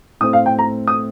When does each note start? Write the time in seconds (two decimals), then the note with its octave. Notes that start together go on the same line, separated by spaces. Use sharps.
0.21 A2 A3 C4 D#6
0.33 F5
0.46 G5
0.59 A#5
0.88 D#6